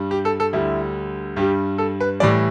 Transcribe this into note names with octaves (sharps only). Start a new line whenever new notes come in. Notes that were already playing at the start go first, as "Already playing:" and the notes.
Already playing: G2 G3
G4
A4
A4
D2 D3 G3 E4
G2 G3 G4
A4
B4
A2 E3 G3 D5